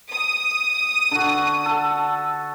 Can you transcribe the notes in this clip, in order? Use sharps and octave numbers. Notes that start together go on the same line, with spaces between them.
D#6
D3 F#4
A4